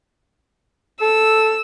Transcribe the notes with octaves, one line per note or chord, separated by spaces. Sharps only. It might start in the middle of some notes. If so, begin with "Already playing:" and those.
A4 E6